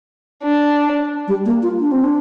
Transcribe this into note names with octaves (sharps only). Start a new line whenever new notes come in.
D4
G3
A#3
F4
D4
C4
D4